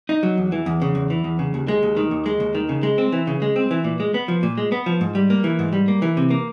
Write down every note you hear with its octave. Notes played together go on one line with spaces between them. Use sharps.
D#4
F#3
E2
E3
E2
C#3
E2
E3
E2
C#3
D#2
G#3
D#2
D#3
D#2
G#3
D#2
D#3
C#3
G#3
C4
E3
C#3
G#3
C4
E3
A#2
G#3
B3
F3
A#2
G#3
B3
F3
G#2
G3
A#3
E3
G#2
G3
A#3
E3
C3
A#3